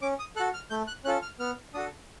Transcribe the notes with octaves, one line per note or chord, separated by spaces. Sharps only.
C#4 D6
D#6
F#4 A4 F#6
F6
A3 G6
F#6
C#4 F4 A4 F#6
F6
B3 F6
D4 F#4 A4 D#6